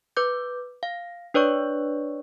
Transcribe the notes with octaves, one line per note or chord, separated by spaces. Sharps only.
B4 D6 G6
F5
D4 B4 C#5 D5 C#6